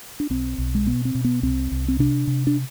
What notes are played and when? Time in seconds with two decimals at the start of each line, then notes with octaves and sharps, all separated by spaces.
0.20 D4
0.30 B1 C4
0.58 B1
0.75 G#3
0.86 B2 B3
1.05 C4
1.15 B2
1.25 B3
1.43 C2 C4
1.72 C2
1.88 C4
1.99 C3 D4
2.27 C3
2.47 D4